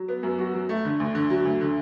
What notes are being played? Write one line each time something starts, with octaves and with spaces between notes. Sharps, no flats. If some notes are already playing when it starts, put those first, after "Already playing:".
Already playing: F#3
B3
F#2
F#4
F#3
A3
D3
D2
D3
F#3
D2
D3